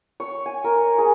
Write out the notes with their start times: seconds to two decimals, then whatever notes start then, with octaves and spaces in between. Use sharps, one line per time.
0.20 C#5
0.46 G#5
0.64 A#4
0.98 G#4